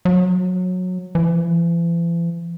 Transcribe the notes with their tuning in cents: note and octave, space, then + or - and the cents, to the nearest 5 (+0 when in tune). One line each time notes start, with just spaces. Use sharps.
F#3 -20
E3 +45